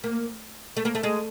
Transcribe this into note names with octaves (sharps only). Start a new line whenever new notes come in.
A#3
A3
A#3
A3
G#3